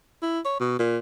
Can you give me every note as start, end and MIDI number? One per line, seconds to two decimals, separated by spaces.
0.22 0.40 64
0.45 0.56 73
0.60 0.79 47
0.79 0.98 46